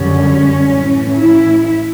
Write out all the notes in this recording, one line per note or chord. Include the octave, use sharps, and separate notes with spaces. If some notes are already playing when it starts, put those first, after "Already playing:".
Already playing: F#2 D3 G3 C#4
A2 E3 A3
E4